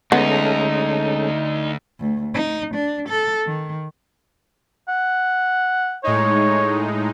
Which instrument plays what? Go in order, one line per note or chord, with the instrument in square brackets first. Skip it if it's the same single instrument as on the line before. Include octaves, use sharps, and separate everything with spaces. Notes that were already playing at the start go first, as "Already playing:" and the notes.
[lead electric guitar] D2 [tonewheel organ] G#3 C#4 A4 [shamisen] B3 [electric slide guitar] D#4
[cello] D2
D#4
D4
A4
D#3
[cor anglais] F#5
[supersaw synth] A2 G#3 D#4 [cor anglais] C#5